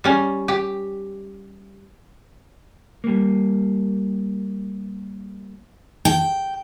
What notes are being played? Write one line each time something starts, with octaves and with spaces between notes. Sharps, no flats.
G3 C#4
G4
G3 A#3
G5